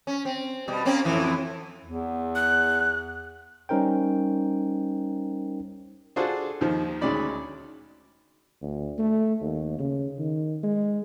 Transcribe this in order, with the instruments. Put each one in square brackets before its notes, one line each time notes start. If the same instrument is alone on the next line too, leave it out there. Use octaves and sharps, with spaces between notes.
[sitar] C#4
C4
B2 G3
A#3 C4 C#4
F2 A2 E3
[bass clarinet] E2
[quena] F#6
[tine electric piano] G3 C#4 D#4 A#4 C5 G5
[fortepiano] D4 F4 F#4 G#4 A4 C5
D#2 D#3 F3
D2 D#3 G#3 C#4 D5 B5
[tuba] D2
A3
D#2
C#3
D#3
G#3